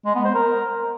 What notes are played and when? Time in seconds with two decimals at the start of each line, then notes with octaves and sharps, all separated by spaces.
0.05 G#3
0.15 B3
0.25 C5
0.35 A#4